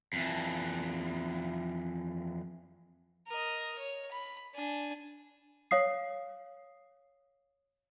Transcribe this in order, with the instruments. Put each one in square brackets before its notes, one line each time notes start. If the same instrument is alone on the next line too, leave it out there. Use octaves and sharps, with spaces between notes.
[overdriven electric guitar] F2 E3
[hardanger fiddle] A#4 D#5
C#5
B5
D4 G#5
[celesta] C#5 F5 D#6 C7